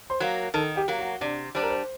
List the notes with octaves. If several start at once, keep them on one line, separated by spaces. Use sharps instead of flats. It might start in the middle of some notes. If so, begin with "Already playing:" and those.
C5 C6
F#3 A#3
D#3 A4 A5
G4 G5
F#3 A#3
F#4 F#5
C3 D4 D5
G3 D4 C5
A#4
C5